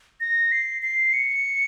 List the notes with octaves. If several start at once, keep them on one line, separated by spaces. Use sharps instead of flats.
A#6
C7
C7
C#7